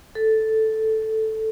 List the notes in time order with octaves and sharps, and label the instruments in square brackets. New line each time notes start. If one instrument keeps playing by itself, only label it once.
[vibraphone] A4